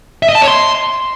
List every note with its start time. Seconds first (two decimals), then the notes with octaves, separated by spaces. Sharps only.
0.23 E5
0.29 D#5
0.35 A5
0.41 C#5
0.48 C6